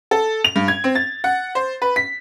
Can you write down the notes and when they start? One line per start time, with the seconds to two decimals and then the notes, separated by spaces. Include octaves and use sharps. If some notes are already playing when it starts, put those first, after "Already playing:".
0.11 A4
0.44 F7
0.56 G2
0.68 G#6
0.84 C4
0.95 A6
1.24 F#5
1.55 C5
1.82 B4
1.96 B6